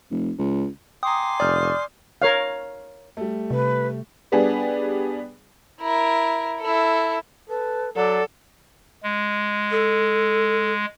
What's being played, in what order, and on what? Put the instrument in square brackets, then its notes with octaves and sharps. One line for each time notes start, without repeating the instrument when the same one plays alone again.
[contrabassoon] F1
C#2
[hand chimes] G5 A#5 [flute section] G#5 C6 D6 [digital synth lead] D#6
[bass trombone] F1 [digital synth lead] D5 [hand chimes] D#6 F6 G6
[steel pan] A#4 C#5 F5
[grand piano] G3 A3
[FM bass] C3 [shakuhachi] B4
[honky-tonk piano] G3 B3 D4 G#4
[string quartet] E4 A#4
E4 A4
[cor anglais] A4 [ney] B4
[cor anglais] F#3 [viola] A4 [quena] D5 [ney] F#5
[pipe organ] G#3
[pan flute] A4